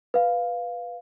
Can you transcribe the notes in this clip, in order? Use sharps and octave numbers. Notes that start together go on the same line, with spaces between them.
B4 F5